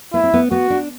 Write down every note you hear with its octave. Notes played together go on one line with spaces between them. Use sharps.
B3 E4
C4
B3
B3 F#4
D4